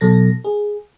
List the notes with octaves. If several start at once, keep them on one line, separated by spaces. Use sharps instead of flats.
B2 F#3 A4 A#6
G#4